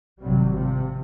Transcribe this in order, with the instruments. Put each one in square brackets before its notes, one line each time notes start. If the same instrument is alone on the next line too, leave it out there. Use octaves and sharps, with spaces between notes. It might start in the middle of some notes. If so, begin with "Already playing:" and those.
[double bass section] G#1 C3 F#3 G3
C3 F3